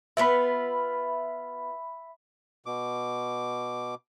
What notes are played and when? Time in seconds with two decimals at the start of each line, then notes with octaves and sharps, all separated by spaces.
0.17 B3 F4 B4 E5 B5
2.66 B2 D6